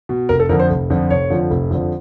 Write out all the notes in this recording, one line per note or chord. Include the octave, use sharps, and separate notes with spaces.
B2
F1 A#4
A4
F2 D3 F3 A#4
C5
F1
F2 D3 F3
F1 C#5
F2 D3 F3
F1
F2 D3 F3